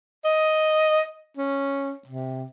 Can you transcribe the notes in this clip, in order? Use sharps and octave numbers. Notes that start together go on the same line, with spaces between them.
D#5
C#4
C3